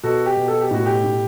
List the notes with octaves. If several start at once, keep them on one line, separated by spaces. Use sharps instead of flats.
B2 F#4 A4
G4
B2
A4
G4
A2 F#4
G4
A2